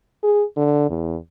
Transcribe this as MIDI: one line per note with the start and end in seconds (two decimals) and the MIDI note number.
0.23 0.43 68
0.56 0.89 50
0.90 1.16 40